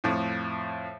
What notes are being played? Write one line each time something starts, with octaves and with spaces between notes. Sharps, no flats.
F2 A2